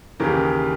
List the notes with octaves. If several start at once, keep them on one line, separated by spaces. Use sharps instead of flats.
D#2 C#3 E3 G4 A#4